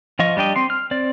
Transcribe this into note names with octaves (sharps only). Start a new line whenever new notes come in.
F3 F4 D#5 C#6
G3 D4 G4 D#5
C4 C6
F6
C4 D5